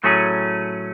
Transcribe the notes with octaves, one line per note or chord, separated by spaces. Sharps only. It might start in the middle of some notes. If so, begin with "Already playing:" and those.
A2 F#3 A3 C#4 G#4